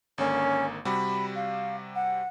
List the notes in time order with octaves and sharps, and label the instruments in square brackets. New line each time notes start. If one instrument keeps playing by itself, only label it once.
[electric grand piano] G#1 D3 A#3 [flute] C#4
[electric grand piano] C3 G3 F#4 [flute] B5
[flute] F5
F#5